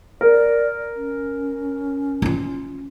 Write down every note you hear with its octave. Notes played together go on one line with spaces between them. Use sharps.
A#4 D5
C#4
D#4 F4